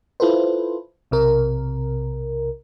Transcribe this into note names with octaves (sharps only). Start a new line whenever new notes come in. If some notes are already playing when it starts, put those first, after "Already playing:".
E4 F4 A4 B4 C5
B1 C3 A#4